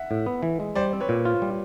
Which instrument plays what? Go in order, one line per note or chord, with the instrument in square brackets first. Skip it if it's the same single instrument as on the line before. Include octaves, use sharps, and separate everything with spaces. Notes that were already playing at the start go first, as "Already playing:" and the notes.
Already playing: [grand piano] E5 F#5
[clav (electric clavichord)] A2
B3
E3
G#3
[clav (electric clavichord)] G3 [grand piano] C5 D5
[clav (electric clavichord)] C4
[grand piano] B4 C#5
[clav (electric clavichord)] A#2
F4
G3